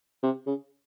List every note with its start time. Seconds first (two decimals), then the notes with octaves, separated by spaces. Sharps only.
0.23 C3
0.46 C#3